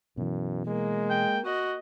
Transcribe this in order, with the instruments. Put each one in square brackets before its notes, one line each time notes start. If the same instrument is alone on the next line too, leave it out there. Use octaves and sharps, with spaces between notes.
[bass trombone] F#2 [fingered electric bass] B2 E3
[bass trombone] G#3 [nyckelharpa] A#3
[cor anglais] G5
[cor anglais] F#4 [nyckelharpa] D#5